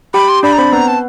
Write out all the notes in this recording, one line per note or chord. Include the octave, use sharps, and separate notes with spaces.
G4 G5 B5
C6
D4 D5 B5
A#5
C4 C5 B5
B3 B4 A#5
A5